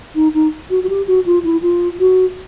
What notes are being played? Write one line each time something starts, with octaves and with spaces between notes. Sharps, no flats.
D#4
D#4
F#4
F#4
G4
F#4
F4
E4
F4
F#4